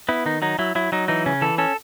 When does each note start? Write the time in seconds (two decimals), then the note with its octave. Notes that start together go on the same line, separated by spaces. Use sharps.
0.09 B3 E4
0.26 D#3 D#4
0.42 F#3 D#4
0.59 F#3 E4
0.75 F#3 E4
0.92 F#3 D#4
1.08 E3 D#4
1.26 C#3 C#4
1.41 E3 A4
1.58 C#4 A4